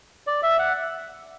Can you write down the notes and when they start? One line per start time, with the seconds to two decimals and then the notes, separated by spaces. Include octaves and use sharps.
0.27 D5
0.43 E5
0.59 F#5